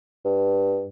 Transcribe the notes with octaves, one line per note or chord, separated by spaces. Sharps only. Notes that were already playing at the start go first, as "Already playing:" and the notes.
G2